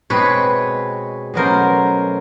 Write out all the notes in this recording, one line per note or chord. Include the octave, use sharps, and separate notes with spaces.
B2 G#3 C4 B4 C#5
B2 F#3 A3 C#4 A#4 C5